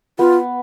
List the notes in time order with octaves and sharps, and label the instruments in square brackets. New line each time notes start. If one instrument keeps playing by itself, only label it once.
[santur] B3 [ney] F4